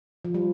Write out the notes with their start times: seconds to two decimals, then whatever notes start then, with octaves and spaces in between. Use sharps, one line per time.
0.25 F3
0.34 G3